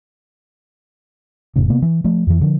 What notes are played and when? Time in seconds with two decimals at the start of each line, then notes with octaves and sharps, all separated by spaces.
1.56 F1 A2 C#3
1.70 C3 A#3 B3
1.82 E3
2.04 F3 A3
2.27 F2 E3
2.41 D3 F3